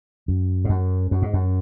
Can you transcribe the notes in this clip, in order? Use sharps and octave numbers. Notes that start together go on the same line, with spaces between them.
F#2
G#2
F#2
F#2
G#2
F#2